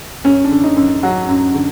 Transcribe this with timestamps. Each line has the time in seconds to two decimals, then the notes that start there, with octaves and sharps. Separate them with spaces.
0.24 F#2 C#4
0.44 D4
0.51 D3
0.64 D#4
0.77 F#2
1.03 F#3 F#4
1.29 F#2
1.54 D3